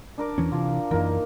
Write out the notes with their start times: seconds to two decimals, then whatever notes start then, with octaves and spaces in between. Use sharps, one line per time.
0.18 D4 A#4 D6
0.38 E2 E3 C#4
0.52 C3 E3 F3
0.91 F#2 E3 A#3 D#4